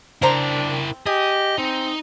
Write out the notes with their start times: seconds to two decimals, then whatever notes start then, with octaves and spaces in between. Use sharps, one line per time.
0.22 C4 D4 E4 A#4 C5 A#5
1.06 G4 G#4 D#5
1.58 C4 D#4